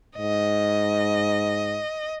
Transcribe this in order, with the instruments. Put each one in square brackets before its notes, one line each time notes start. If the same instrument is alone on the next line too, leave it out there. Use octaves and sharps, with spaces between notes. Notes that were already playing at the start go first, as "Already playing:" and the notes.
[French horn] G#2 [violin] D#5